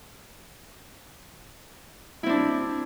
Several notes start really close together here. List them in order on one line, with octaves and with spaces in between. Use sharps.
E4 C4 D4